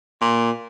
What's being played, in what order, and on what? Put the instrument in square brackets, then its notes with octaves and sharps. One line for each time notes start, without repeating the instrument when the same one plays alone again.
[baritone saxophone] A#2